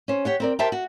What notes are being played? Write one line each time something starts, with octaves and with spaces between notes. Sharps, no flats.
C#4 C5
G4 C#5 F#5
C4 A#4 D5
G4 A#4 C5 E5 G5 A5
F#4